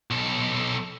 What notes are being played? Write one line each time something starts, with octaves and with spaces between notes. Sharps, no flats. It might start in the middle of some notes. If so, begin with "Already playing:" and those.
B1 A4